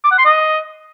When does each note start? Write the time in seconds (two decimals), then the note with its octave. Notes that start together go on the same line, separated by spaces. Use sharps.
0.04 D6
0.11 F#5
0.18 C6
0.25 D#5